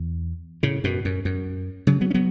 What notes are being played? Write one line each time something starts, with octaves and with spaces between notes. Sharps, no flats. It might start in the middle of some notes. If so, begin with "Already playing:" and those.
Already playing: E2
A2 C#3
F#2 B2
F#2
F#2
C#3 F#3
F#3 B3
C#4
F#3 B3